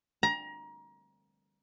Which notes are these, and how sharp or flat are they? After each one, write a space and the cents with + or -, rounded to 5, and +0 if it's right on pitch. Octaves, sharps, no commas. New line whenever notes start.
A#5 +25